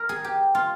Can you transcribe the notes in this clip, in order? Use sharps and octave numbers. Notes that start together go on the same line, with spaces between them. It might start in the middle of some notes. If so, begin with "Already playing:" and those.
Already playing: A#4
G#4
G4
F4